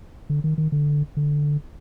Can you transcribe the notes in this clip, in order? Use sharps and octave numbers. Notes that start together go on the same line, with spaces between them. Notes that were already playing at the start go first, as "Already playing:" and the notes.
D3
D#3
D#3
D3
D3